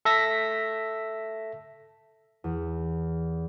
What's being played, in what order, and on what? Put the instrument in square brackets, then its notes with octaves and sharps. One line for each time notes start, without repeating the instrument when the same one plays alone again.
[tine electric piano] A4 E5 A#6 B6
[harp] E2